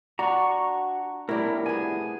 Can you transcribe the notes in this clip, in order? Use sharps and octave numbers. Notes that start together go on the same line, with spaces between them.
D4 F#4 A#5 C#6
C2 A2 G3 E4 A#4
B3 G#4 G#5